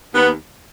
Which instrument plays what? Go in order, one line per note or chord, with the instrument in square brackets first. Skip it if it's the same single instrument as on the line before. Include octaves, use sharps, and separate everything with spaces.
[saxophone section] D#2 B3